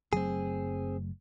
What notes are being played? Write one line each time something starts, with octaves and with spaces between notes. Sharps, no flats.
F#1 F#3 A3 C4 G#4